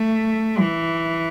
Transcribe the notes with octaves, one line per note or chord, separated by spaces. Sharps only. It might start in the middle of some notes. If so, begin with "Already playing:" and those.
Already playing: A3
E3